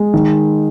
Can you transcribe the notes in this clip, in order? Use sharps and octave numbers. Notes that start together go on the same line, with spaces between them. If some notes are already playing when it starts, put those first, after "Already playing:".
Already playing: G#3
D#3